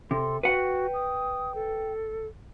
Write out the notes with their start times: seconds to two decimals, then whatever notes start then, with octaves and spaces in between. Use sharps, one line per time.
0.11 C3 A4 C6
0.43 F#4 B4 F#5 G5
0.94 D#6
1.55 A4